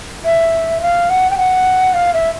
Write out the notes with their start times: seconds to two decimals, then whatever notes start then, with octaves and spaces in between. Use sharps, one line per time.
0.25 E5
0.82 F5
1.10 F#5
1.30 G5
1.38 F#5
1.94 F5
2.14 E5